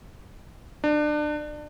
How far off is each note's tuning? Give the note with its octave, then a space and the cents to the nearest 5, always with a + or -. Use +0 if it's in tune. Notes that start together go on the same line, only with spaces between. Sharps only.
D4 +30